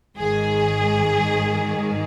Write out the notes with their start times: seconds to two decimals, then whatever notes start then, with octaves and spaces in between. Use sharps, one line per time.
0.17 G#1 G#2 D#3 G#4